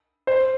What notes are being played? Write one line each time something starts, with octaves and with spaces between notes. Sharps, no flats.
C5